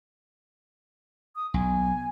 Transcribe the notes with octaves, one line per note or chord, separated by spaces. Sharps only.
D#6
B1 G#5